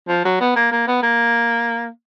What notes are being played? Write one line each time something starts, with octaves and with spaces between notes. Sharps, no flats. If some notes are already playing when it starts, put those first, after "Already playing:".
F3
F#3
B3
A#3
A#3
B3
A#3